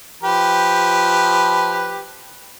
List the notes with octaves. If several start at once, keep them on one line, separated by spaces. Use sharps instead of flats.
F3 G4 B4